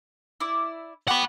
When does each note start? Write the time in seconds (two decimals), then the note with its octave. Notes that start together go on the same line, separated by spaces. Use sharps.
0.40 E4 D5
1.08 F#4 G4 D5 F#5 B5